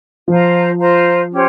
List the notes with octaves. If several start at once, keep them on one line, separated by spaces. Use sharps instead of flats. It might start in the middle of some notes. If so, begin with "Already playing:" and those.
F3 F4 C5 F5 A#5
F4 C5 F5 A#5
C#4 G4 C5